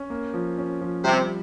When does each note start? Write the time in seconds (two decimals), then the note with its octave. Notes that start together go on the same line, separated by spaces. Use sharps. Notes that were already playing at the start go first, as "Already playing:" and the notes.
Already playing: C#4
0.10 A#3
0.34 F3
0.58 C#4
0.81 F3
1.04 C3 G3